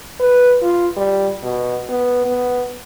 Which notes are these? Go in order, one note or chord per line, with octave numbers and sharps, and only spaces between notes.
B4
F4
G3
B2
B3
B3